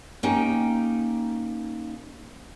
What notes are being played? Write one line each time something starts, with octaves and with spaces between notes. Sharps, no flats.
A#3 C#4 D#4 G4 G5